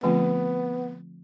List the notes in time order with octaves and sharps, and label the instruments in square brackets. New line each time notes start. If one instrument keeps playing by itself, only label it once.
[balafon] D3 F3 A3 C4 F4 [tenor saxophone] B3